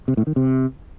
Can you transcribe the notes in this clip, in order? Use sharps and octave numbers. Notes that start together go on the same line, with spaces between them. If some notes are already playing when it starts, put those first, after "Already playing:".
C3
A2
D#3
C3